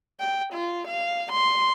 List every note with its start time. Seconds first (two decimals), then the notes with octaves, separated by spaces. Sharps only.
0.20 G5
0.53 F4
0.87 F5
1.32 C6